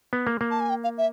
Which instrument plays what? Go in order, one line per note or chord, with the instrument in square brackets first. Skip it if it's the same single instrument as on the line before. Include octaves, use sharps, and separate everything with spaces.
[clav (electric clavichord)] B3
A#3
A#3
[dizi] A5
G#5
G5
F5
E5